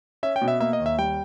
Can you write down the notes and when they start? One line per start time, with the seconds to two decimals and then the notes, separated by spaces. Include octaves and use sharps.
0.23 C#4 E5
0.36 G5
0.42 B2
0.48 E5
0.60 A#3 E5
0.73 D#5
0.80 D#2
0.86 E5
0.98 G3 G5